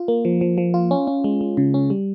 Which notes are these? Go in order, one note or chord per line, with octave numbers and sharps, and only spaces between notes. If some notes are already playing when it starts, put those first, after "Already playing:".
Already playing: F4
A#3
F3
F3
F3
F4
C#4
C#4
G#3
G#3
C#3
C#4
G3